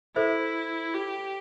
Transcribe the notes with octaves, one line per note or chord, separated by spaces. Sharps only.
E4 A4 C5 E5
G4